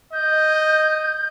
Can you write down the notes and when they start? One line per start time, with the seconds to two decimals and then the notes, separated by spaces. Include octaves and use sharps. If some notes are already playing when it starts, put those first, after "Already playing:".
0.13 D#5 G6